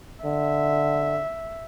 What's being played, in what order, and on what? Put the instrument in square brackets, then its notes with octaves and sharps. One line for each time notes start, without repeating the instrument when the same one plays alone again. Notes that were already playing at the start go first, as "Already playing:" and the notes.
[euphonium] D3 [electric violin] E5